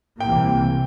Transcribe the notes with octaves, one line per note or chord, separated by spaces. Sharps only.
C2 C3 E3 A#3 G5